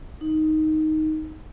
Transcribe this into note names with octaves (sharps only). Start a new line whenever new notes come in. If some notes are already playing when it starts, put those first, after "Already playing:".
D#4